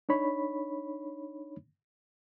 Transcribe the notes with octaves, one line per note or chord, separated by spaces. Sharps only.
D4 D#4 C#5 B5